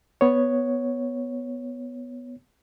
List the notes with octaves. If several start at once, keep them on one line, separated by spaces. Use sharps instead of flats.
B3 C#5